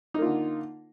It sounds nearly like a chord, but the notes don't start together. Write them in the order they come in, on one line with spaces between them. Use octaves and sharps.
D#4 A#3 F4 D3